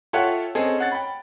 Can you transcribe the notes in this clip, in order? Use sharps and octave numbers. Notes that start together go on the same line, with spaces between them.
F4 A4 C#5 E5 F#5 G5
C4 C#4 G#4 A4 D#5
C#4 F#5 A6
G5 B5